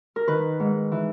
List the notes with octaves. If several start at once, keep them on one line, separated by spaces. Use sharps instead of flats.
A#4
D#3 B4
G#2
E3